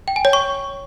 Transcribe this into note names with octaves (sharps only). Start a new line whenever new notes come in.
G5
G#5
C#5
C#6